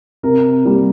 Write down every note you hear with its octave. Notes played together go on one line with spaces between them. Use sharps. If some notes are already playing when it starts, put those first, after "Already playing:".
C3 A#4
G3 A#3